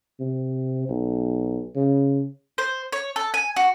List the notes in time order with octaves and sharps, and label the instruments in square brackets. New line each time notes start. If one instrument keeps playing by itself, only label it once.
[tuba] C3
B1
C#3
[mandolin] C5
C#5
A4
G#5
F#4